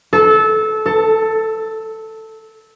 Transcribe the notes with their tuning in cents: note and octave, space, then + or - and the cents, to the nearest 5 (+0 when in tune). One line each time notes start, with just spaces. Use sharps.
A4 -20
A4 +10